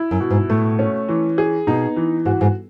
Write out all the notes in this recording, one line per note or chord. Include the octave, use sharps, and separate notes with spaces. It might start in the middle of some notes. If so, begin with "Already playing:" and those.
Already playing: E4
F#2
B2
G#2
A2 A3
C#4
E3
G#4
B2 D#4
E3
G#2 F#4
G#2